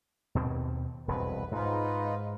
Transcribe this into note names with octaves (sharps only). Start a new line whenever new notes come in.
D#2 B2 C4
E1 C2 F2 B4
G#2 G#3 D#4 F4 B4